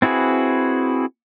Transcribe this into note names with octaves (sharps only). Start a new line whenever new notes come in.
C4 E4 F#4 G#4 B4